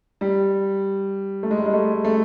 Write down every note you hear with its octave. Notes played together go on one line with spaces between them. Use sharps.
G3
A3
G#3
G3
G#3
A3
A3